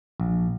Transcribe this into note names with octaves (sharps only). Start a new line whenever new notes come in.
A#1